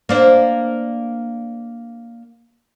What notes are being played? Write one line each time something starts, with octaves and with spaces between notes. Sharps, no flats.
A#3 D4 C5